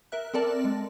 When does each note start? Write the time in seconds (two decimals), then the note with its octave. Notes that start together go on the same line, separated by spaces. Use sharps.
0.12 A#4 E5 F#6
0.34 C4 A4 A#4 D5 A5
0.64 G#3